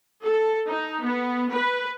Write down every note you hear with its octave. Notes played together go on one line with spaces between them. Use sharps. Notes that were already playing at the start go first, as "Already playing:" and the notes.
A4
D#4
B3
B4